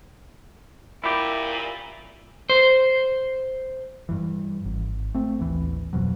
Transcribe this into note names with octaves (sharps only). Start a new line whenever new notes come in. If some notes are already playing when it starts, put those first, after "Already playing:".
A#2 E4 G4
C5
G2 E3
G#1
A3 C4
A1 D#2 E3
D1 F2 B2 F#3